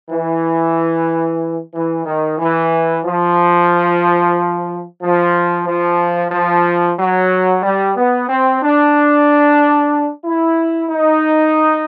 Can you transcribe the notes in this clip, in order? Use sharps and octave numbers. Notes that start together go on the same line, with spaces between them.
E3
E3
D#3
E3
F3
F3
F3
F3
F#3
G3
B3
C4
D4
E4
D#4